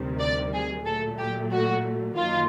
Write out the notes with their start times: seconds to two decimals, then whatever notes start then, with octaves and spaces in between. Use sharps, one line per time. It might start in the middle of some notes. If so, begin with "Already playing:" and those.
Already playing: D2 C3 D#3 G3
0.20 D5
0.53 G#4
0.85 A#2 F#3 A3 A4
1.18 G4
1.51 F#4
2.16 F#2 D#3 F#3 A#3 F4